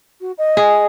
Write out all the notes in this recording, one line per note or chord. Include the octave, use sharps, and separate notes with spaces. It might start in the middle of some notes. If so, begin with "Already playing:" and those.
F#4
D#5
G#4